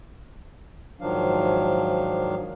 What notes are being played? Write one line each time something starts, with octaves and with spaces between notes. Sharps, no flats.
G#2 D#3 F3 F#3 D4 F5